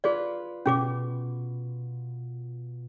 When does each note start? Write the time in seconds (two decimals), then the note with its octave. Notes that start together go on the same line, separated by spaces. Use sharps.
0.04 F4 G#4 B4 D5
0.66 B2 C#4 G#4 D6